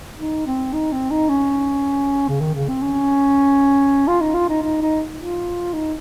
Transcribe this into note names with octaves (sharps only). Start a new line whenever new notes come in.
D#4
C4
D#4
C4
D#4
C#4
C#3
D#3
C#3
C4
C#4
F4
D#4
F4
D#4
D#4
D#4
F4
D#4